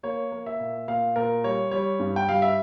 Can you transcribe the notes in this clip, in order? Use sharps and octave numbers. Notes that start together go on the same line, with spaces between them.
A#3 C#5
A#3
E5
A#2
A#2 F5
A#2 A#4
G3 C#5
G3 C#5
G2
G5
G3 F5
E5